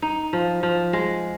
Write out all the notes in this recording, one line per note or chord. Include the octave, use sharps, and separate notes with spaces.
D#4
F3
F3
G#3